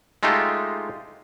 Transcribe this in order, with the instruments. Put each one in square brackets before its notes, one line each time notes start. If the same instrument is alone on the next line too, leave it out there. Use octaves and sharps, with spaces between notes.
[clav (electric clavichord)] G#3 A3 D#4 F4 G4 A4